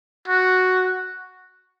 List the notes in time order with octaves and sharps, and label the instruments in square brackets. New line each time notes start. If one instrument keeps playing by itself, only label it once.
[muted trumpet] F#4